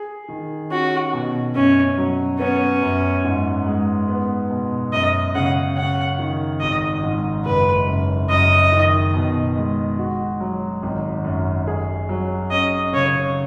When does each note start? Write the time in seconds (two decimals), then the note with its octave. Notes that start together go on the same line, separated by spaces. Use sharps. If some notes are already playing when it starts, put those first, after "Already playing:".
Already playing: G#4
0.28 D#3
0.70 C#4 F#4
1.13 B2
1.55 F#2 C#4
1.98 F#3
2.39 B3 C#4
2.82 F#2
3.24 G#2
3.66 G#3
4.08 B3
4.50 B2
4.92 F#2 D#5
5.35 C#3 F#5
5.76 C#4 F#5
6.19 D#3
6.60 G#1 D#5
7.03 G#2
7.45 F#1 B4
7.87 F#2
8.29 F#2 D#5
8.72 D#3
9.14 B2
9.56 G#3
9.98 F#4
10.40 F#3
10.83 G#1
11.24 F#2
11.67 G#4
12.09 F#3
12.51 C#4 D#5
12.93 C#3 C#5